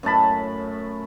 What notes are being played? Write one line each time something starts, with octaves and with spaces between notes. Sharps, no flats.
F#2 A2 A5 B5